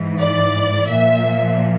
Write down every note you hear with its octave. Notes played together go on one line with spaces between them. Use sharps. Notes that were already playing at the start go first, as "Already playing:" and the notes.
Already playing: G#2 E3
D5
A#2 F3 E5